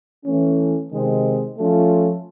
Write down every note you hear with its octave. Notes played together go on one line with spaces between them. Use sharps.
E3 A3 C#4
C3 D#3 G#3 C4
F3 A3 C#4 F4